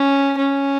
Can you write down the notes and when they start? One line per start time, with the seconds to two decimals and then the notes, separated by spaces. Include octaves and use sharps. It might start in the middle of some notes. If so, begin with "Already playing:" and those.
Already playing: C#4
0.38 C#4